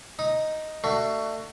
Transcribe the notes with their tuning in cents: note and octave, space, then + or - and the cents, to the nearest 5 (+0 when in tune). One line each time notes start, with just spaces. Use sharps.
D#4 +0 D#6 +0
A3 +25 D4 +35 F#4 +15